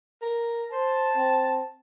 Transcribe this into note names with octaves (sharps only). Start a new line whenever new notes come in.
A#4
C5 A5
C4